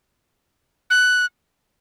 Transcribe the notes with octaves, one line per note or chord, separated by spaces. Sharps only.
F#6